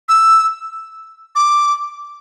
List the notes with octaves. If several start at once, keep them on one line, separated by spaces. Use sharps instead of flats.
E6
D6